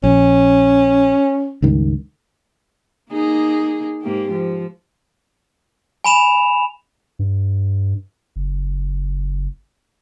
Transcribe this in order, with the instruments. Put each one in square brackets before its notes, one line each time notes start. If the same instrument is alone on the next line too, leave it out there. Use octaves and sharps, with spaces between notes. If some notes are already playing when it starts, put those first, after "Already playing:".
[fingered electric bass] A#1 [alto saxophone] C#4
[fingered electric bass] C#2 G2 D#3
[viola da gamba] A#3 D#4 G#4
G#2 A#3 G4
F3
[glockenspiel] G#5 B5 E7 F7
[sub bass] G2
F#1